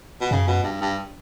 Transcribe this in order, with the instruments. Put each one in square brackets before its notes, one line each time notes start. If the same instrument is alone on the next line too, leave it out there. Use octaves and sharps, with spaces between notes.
[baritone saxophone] B2
[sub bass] F#2 [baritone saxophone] C#3
[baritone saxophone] B2
G2
G2